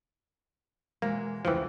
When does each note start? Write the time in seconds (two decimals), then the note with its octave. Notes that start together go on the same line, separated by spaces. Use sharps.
1.02 B2 E3 G#3 A#3
1.45 D2 C#3 E3 F3 G5